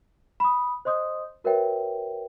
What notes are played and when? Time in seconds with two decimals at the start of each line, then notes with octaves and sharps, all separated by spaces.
0.40 B5 D#6
0.85 C5 D#5 C6 D#6 G6
1.44 F#4 A#4 B4 C#5 E5 G5